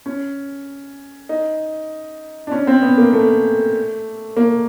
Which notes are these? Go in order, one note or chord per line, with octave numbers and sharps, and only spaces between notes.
C#4
D#4
D4
C#4
C4
B3
A#3
A3
A#3